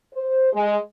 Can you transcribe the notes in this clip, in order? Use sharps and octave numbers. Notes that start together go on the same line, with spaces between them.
C5
G#3